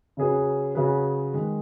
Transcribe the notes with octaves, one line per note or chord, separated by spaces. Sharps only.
C#3 F#3 C#4 G#4 B4
C#3 F#3 C#4 G#4 B4
D#3 G#3